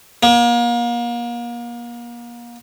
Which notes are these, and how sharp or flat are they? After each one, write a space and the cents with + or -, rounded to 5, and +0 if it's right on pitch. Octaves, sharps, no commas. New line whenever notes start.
A#3 +35